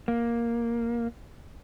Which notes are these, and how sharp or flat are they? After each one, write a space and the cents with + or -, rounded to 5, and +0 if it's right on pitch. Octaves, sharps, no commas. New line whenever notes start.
A#3 +5